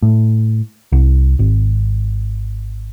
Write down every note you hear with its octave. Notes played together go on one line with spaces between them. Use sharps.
A2
C2
G#1